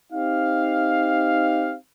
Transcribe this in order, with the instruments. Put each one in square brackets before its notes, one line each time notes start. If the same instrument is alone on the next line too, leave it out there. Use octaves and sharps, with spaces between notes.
[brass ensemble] C4 D#4 G4 F5